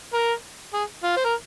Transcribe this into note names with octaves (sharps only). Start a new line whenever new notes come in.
A#4
G#4
F4
C5
A#4